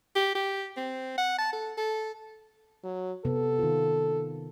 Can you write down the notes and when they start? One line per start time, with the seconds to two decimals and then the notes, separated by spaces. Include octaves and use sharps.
0.16 G4
0.35 G4
0.77 C4
1.18 F#5
1.38 A5
1.53 A4
1.78 A4
2.84 F#3
3.25 C3 B3 A4
3.59 D#3 F4